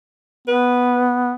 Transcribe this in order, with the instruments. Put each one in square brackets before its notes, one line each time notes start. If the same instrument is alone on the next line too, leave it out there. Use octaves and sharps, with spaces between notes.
[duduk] B3 [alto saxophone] B4